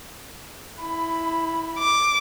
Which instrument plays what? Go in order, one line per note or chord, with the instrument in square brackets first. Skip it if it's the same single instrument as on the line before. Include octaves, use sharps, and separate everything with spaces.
[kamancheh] E4 B5
[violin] D6